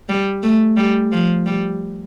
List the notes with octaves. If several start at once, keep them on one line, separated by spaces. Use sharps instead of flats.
G3
A3
G3
F3
G3